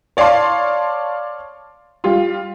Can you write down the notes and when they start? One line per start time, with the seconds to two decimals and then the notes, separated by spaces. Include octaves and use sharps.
0.17 C#5 D5 F5 A5 C6
2.04 G3 F4